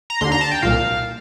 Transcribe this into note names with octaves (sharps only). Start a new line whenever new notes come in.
A#5
D#2 D3 C6
A#5
A5
G5
C2 A#2 F5